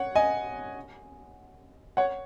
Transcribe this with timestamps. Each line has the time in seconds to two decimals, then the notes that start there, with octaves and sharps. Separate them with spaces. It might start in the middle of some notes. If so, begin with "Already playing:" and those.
Already playing: C#5 F#5
0.15 D#5 G#5
1.97 C#5 F#5